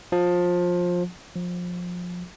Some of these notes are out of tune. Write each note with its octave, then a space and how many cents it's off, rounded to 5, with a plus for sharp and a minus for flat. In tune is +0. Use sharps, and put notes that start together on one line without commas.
F3 +20
F3 +25